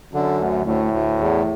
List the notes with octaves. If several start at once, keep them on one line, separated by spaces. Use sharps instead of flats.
F#2 D3
D2
D2 A2
D2
E2